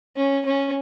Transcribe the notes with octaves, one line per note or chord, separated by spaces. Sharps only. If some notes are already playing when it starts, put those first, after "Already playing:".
C#4
C#4